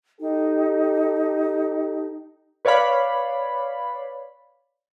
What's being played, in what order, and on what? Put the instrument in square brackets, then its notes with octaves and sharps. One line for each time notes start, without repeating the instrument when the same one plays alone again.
[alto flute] D#4 [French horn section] G4 A4
[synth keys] B4 C#5 D5 F5 B5